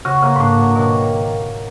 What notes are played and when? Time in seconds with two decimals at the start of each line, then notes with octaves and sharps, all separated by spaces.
0.05 C#3 F#4
0.22 C#3 A#3
0.36 G#2
0.40 A2 D4
0.58 F#3
0.76 B2 D#3